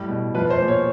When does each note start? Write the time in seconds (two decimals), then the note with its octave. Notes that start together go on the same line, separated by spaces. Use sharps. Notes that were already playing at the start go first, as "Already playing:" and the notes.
Already playing: A2 G3
0.09 B2
0.35 F3 B4
0.50 C5
0.59 A#2
0.68 C#5